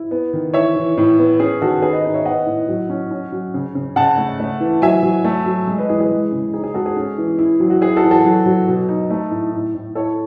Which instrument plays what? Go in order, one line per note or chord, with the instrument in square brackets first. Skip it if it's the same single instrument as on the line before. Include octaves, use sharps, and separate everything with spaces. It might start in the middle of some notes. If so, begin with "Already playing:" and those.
Already playing: [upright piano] E4
B3
D#3
E3 C#5 E5
E3
A2
B3
C#4 G#4
D#3 F#4 A4
B3 G#4 B4
B4 D#5
D#4
C#5 E5
B3 D#5 F#5
A2
F#3
C#4
C#4
F#3
C#3
C#3
C#3 F#5 A5
A3
A3
E3
F#3 E5 G#5
F#3
A3
F#3
G#3
B4 D#5
E3 G#4
G#4 B4
G#3
C#3
D#4 G#4
G#4
G#3 F#4 A4
G#4
C#4
E3
E4
F#3
F#4
E4 G#4
F#4 A4
E3
F#4 A4
F#3
F#3
B2
D#4
A3
A2
A2
A2
E4 A4 C#5